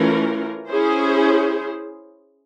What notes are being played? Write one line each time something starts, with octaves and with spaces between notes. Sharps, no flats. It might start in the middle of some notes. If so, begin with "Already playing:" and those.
Already playing: E3 A3 C#4 F4 A#4
C#4 E4 G#4 C5